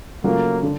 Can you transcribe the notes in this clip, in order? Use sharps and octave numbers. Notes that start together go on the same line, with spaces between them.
C#3 F#3 A3 A#3 C#4 F4
D3